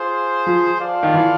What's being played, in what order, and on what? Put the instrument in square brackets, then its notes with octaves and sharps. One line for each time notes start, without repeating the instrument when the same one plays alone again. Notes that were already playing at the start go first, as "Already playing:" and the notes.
Already playing: [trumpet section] F4 G#4 C5
[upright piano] F3
[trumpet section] F4 A4 D5 F5
[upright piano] D#3
E3